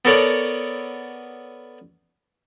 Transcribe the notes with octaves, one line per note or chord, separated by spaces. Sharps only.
B3 A4 A#4 C#5 D5 F#5